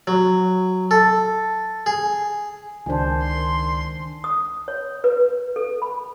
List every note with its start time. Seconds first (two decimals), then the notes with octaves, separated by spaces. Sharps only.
0.07 F#3
0.91 A4
1.86 G#4
2.86 C#2 D#3 D4 C5 G#5 A5
3.23 C6
4.24 D#6
4.68 C#5
5.04 B4
5.56 A4
5.82 B5